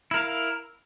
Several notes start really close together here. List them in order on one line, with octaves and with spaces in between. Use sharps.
E4 A#4 F5